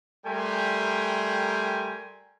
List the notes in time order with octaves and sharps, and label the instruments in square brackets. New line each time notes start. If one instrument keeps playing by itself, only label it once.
[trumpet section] G3 A3 A#4 G5 G#5 C6